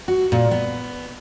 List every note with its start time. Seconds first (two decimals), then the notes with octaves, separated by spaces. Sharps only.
0.08 F#4
0.32 A#2
0.51 B3